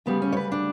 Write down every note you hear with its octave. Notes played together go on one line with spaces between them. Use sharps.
D2 C#3 G3 B3
C#4
C#5
B4
D4